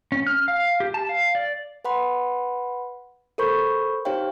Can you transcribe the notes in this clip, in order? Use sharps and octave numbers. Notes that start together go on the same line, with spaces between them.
C#4
F6
F5
G4
A5
F5
D5
B4 F#5 B5 C6
A4 A#4 C5 B5 C#6 G6
D#4 G4 C5 C#5 F5 G5